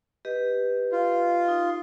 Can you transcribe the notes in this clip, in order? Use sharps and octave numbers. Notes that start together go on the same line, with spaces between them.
G4 B4 D#5
F4
D#4